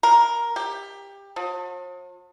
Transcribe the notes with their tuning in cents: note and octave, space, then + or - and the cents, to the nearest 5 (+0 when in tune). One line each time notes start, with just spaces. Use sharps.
A#4 +10
G4 +20
F3 +45